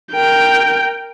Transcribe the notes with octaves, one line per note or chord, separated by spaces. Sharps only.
A#4 G5